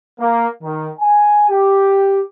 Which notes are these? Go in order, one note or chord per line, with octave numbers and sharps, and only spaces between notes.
A#3
D#3
G#5
G4